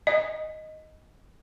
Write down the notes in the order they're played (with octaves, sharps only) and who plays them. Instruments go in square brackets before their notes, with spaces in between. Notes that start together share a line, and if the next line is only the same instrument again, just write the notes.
[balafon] D#5